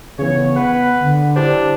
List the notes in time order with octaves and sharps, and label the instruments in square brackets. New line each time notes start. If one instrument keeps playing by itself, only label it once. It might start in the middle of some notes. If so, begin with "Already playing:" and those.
[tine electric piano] C#3 E3 [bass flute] B3 [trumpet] C#5
[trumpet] B4 [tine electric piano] F#5
[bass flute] D3
[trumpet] D4 [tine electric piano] E4 G4 C5